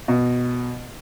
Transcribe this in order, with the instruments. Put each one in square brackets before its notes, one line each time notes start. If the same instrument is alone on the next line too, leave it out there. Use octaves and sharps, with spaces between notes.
[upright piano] B2